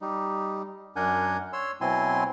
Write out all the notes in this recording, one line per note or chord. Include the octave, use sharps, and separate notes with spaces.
G3 D#4
F#2 D4 A#4 F#5 G#5 G6
C#5 C6 E6
B2 F#3 C4 E4 G#5 C6